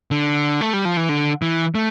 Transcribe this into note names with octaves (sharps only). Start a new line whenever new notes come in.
D3
A3
G3
F3
E3
D3
E3
A3